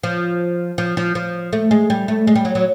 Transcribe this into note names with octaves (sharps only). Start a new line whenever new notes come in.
F3
F3
F3
F3
A3
G#3
G3
A3
G#3
G3
F#3
F#3